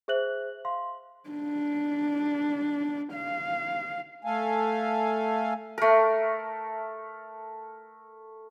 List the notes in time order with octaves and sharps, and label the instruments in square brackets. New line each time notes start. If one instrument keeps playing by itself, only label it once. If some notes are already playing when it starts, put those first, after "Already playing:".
[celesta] G#4 C5 E5 F#6 F#7
F5 C6
[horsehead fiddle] D4
F5
[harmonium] A3 A4 F5 G#5
[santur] A3 A#4